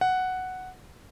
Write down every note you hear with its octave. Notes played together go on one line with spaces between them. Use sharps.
F#5